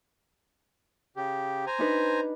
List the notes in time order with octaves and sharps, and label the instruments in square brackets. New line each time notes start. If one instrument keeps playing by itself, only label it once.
[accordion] C#3 G4
C5 G#5 A#5
[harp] D4 D#4 B4